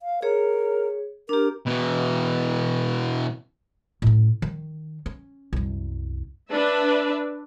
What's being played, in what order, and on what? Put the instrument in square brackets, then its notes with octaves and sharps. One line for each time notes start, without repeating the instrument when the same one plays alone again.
[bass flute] F5
[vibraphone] G#4 C#5 [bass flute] A#4
[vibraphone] D4 G4 [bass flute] A#4
[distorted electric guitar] B2 E3
[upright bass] A2 C#4
D#3
C#4
C2 F#2
[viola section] D4 B4 E5